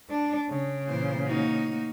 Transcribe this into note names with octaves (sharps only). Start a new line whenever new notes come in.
D4
C#3
A#2 E3 C5
A#3 D#4 F#4